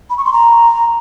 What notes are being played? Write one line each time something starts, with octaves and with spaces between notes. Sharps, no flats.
B5
C#6
C6
A#5